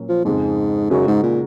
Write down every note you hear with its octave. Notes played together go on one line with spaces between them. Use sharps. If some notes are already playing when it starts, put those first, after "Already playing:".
Already playing: A#2 F#3 C#4
F3
F2 G#2 C#3 G#3
F#2 C#3 G#3 D#4 F#4
G#2
A#2